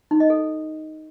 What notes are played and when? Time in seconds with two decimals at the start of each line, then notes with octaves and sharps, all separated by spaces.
0.11 D#4
0.20 D#5
0.30 A4